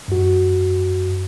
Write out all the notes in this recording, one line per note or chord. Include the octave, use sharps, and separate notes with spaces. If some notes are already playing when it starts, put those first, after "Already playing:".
F#2 F#4